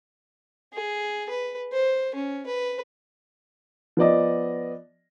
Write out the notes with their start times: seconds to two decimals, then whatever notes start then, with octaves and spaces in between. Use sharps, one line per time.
0.73 G#4
1.29 B4
1.72 C5
2.14 C#4
2.46 B4
3.97 F3 B3 D5 D#5